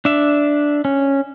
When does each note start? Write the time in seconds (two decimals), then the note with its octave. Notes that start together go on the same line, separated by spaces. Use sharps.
0.05 D4 E5
0.85 C#4